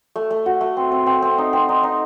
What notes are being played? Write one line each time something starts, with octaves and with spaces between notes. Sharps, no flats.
A3
A3
F#4
A3
C4
C4
C4
C4
D#4
C4
D#4
D#4